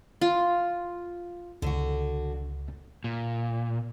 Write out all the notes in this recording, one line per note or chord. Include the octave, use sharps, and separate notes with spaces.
F4
C#2 D3 F#4
A#2